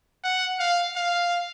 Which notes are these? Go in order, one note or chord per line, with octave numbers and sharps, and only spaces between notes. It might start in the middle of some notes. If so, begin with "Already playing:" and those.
F#5
F5
F5